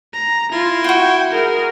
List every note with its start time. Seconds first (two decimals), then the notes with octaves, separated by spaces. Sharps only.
0.13 A#5
0.52 E4 F4
0.84 F4 F#4 G5
1.30 G#4 A#4